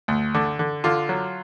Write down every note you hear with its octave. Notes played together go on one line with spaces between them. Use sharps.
D2
D3
D3
D3 F4
F#3